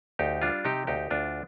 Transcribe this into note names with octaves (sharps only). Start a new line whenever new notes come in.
D2 D#4 G4
G3 D4 F4
C3 D#4 G4
D2 D#4 G4
D2 D4 F4